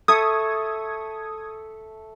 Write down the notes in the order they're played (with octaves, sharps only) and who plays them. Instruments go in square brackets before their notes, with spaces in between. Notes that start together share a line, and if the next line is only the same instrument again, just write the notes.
[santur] A4 E5 C#6 [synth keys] D#6 G#6